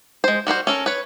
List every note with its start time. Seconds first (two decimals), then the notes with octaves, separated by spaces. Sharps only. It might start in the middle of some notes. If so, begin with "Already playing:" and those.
0.24 G#3 C5
0.47 G3 F#4 B4 C5
0.67 C#4 A4 A#4
0.86 B4 C#5